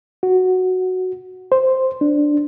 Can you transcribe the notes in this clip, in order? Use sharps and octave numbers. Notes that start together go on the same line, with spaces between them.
F#4
C5
D4